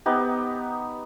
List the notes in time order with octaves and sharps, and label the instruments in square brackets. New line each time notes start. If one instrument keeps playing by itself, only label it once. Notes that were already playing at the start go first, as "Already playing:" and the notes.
[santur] B3 D#4 G4